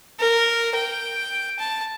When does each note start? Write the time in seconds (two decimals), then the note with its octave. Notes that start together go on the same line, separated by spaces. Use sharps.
0.19 A#4
0.75 G5
1.59 A5